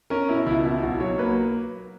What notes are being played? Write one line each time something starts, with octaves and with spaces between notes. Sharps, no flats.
C#4 A#4
B2 E4
C#2 E4
B2 E4
B1 F#4
F#3 C#5
A#3 B4